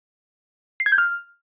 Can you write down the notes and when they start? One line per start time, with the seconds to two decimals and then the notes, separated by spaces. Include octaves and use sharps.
0.80 C7
0.86 G#6
0.92 G6
0.98 F6